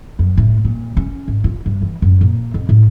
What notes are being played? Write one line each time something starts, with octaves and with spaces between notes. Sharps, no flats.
F#2
A2
A#2
C#4
G#1
F4
G2
E3
F#2
A#2
F2
A2